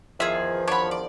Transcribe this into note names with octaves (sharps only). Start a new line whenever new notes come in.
E2 D#3 F3 F4 G#4 E5
B3 D4 C#5 B5
D5